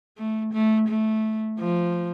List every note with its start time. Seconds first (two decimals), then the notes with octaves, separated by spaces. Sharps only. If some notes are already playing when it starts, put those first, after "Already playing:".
0.18 A3
0.53 A3
0.88 A3
1.59 F3